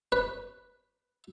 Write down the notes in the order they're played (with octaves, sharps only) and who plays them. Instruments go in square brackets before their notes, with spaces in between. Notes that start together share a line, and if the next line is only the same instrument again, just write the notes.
[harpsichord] B4